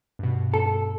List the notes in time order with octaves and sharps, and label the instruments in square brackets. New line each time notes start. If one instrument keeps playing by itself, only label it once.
[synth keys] G2 B2
[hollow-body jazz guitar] A4